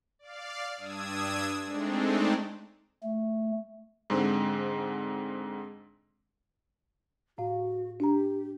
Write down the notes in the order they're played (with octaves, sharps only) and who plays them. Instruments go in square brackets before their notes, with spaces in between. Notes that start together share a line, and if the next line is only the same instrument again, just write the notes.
[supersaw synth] D5 F5
G2 D4 D#6 E6 G#6
G#3 A3 C4 D4 D#4
[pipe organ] A3
[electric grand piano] G#2 D3 G#3 C4
[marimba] A2 F5 [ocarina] F#4
[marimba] D4 A#5 [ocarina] G4